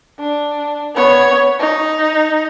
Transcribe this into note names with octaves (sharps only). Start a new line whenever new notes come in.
D4
B3 C#5
D#4